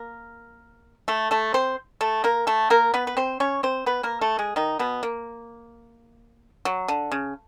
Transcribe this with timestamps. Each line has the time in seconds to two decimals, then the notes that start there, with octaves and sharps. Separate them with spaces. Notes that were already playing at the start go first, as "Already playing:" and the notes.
Already playing: A#3 A#4
1.08 A3 A4
1.31 A3 A4
1.54 C4 C5
2.01 A3 A4
2.24 A#3 A#4
2.47 A3 A4
2.70 A#3 A#4
2.94 B3 B4
3.07 B4
3.17 C4 C5
3.40 C#4 C#5
3.63 C4 C5
3.86 B3 B4
4.03 A#3 A#4
4.21 A3 A4
4.39 G#3 G#4
4.56 D#3 D#4
4.79 B2 B3
5.03 A#3
6.65 F#3
6.88 D3
7.12 C#3